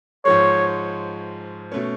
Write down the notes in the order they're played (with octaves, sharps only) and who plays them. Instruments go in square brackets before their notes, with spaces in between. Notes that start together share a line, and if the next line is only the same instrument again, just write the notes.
[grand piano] G#2 F3 G#3 [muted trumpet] C#5
[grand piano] B2 A3 C#4